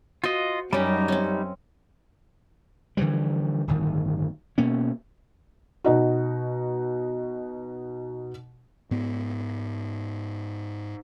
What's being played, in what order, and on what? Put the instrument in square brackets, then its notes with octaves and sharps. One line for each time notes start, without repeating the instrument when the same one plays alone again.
[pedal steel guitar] F4 D#5 [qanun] F#4 C5
[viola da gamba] F#2 [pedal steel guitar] G3 D#4 [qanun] C#4 G4
[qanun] C4 C#4
[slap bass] D3 E3 F3 G3
D1 G1 D#3
B2 A#3 C#4
[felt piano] B2 D#4 F#4
[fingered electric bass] G#2 B3